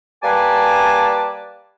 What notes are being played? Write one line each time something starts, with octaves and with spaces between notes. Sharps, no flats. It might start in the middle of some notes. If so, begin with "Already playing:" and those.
G3 A#3 B4 G#5 A5 D6